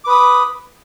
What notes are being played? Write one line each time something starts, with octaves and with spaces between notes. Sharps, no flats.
B4 B5 D6 D#6